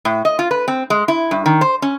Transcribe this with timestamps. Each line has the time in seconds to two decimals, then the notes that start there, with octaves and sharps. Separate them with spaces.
0.05 A2
0.25 D#5
0.39 F4
0.51 B4
0.68 C4
0.90 G#3
1.08 E4
1.31 G2
1.46 D#3
1.61 C5
1.82 C#4